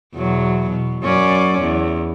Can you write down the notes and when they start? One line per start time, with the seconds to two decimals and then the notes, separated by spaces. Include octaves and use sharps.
0.14 E2 B2 F#3
0.69 B2
1.03 F#2 C#4 D5
1.62 E2